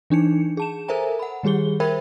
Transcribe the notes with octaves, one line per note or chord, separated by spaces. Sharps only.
E3 D4 D#4 C#7
G#4 A5 E7
A4 A#4 C5 E5 G#5 A#5
F#5 B5
D#3 G3 G4 G#4 G7
A#4 C5 E5 G5 B5 G#6